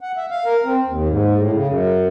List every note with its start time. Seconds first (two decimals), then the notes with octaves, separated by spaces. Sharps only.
0.01 F#5
0.17 E5
0.30 F5
0.46 A#4
0.64 C4
0.86 D#2
1.09 G#2
1.37 A2
1.52 C#3
1.67 F#2